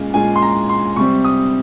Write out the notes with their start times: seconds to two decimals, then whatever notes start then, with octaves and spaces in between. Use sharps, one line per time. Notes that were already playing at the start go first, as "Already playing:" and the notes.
Already playing: A#2 G#3 C#4 F4
0.14 A#2 G#3 C#4 F4 G#5
0.36 C6
0.42 A#5
0.69 C6
0.96 C3 G3 C4 C#6
1.24 D#6